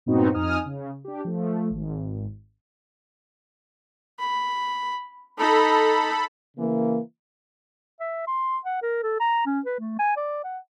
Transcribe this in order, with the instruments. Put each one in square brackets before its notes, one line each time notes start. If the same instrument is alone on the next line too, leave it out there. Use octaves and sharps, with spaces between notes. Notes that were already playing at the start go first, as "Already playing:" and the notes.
[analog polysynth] G2 A#2 B3 C4 D#4 F#4
F2 D#4 G#5 D#6 F6
C#3
D4 G4
F3 A3
G#1
[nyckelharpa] B5
[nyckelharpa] D#4 [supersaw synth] A4 B5
[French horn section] C#3 E3 A#3
[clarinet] E5
C6
F#5
A#4
A4
A#5
C#4
B4
A3
G#5
D5
F#5